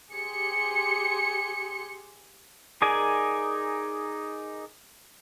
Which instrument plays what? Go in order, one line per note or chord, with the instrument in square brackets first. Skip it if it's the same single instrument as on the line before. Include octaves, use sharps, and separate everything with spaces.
[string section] G4 G#4 C6 C#7
[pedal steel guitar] D#4 G#4 A#4 D5 G#5